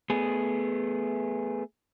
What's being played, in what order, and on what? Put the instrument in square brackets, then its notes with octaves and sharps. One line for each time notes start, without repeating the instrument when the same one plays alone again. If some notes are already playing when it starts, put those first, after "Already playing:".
[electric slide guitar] A3 B3 G#4